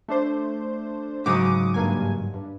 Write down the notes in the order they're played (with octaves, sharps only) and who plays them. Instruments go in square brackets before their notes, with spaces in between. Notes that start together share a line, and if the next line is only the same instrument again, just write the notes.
[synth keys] A3 D4 C5
[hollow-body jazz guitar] G#2 C#3 F#3 [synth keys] D6 D#6
[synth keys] G2 A#3 G#5
G2